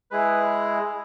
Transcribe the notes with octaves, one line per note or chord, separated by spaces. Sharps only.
G#3 E4 G#4 B4